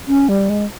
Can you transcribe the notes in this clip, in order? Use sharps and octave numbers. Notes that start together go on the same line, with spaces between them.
C#4
G3
G#3